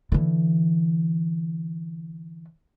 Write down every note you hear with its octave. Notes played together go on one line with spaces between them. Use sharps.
D3 E3